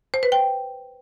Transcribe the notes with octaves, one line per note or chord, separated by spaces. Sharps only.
C5
B4
G5